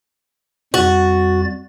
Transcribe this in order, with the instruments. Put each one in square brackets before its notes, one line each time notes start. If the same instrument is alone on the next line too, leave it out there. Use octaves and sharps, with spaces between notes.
[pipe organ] F2 G3 A6 [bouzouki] F#4